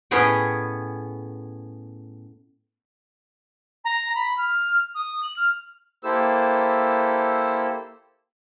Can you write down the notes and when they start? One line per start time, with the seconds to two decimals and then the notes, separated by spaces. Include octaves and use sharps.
0.11 A2 B3 C#4 G#4 D#5 G5
3.84 A#5
4.15 B5
4.37 F6
4.94 D#6
5.23 F#7
5.36 F6
6.03 A#3 E4 G4 A4 C5 E6